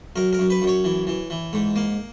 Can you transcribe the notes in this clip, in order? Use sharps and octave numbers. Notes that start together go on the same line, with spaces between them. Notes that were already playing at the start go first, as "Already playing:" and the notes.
F#2 A#4
A#4
F#2
B4
F#2
C#5
E3
E3
E3
G#2
A#3